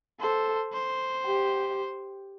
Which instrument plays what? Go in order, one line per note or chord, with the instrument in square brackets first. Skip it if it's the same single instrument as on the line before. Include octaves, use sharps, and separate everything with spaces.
[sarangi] A4 [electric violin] C5
[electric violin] C5
[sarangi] G4